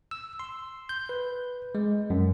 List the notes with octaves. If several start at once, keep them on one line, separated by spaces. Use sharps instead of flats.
E6
C6
G6
B4
G#3
F#2